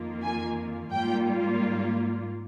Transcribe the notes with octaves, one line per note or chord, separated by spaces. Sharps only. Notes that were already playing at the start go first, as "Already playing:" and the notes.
Already playing: F2 D#3 A#3 F4
G#5
G#2 G3 A#3 F4 G5